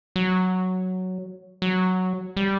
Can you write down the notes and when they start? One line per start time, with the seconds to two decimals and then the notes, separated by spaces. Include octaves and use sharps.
0.16 F#3
1.62 F#3
2.37 G3